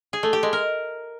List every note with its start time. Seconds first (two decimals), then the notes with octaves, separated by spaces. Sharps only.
0.13 G#4
0.23 A3
0.33 G4
0.43 G#3
0.53 A#4